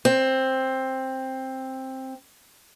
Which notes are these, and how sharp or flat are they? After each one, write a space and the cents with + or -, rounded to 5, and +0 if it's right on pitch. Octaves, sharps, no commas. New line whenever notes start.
C4 +10